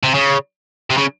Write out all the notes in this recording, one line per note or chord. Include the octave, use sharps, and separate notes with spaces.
C3
C#3
C3
C#3